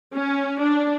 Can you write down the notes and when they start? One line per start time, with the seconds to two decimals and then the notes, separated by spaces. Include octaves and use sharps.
0.15 C#4
0.60 D4